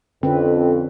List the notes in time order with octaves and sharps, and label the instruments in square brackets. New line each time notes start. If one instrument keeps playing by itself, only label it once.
[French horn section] F2 [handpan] D3 C#4 B4 [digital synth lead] C4